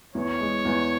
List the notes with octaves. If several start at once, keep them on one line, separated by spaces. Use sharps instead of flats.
E2 C#5
G#3
E2